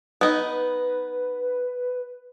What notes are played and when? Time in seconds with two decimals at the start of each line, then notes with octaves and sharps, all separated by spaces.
0.21 B3 D#4 B4